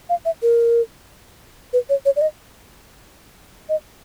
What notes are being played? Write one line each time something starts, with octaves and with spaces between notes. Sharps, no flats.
F5
E5
A#4
B4
C#5
C#5
D5
D#5
D#5